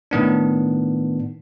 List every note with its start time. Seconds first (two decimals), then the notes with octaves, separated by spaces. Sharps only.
0.11 A2 D#3 B3 D4